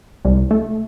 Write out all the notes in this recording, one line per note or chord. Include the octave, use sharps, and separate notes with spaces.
C2
A3